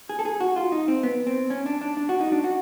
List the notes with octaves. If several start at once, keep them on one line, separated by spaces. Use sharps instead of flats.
G#4
A4
G#4
F#4
F4
D#4
C4
B3
C4
C#4
D4
D4
D4
F#4
D#4
D4
F#4